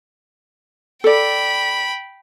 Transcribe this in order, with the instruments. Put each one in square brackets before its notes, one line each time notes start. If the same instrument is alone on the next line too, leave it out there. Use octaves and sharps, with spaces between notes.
[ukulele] A4 D5 [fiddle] G5 B5